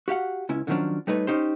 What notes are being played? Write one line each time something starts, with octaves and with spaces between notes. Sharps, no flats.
F#4 G4 F5 F#5
C#2 C#4 E4
D3 D#3 F3 F#3 C#4 D4
G3 A3 D#4 B4 C#5
C#4 D#4 G4 C5